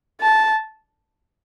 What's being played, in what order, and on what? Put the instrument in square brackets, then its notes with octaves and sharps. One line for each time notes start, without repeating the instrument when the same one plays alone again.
[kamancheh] A5